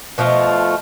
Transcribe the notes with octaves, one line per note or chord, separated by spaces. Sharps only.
B2 F3 A3 F4